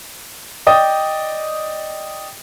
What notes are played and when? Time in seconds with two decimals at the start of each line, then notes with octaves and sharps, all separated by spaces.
0.67 D5 D#5 G5 D#6